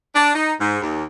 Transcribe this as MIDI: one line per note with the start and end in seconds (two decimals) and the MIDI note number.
0.15 0.32 62
0.34 0.52 63
0.60 0.77 44
0.81 1.04 39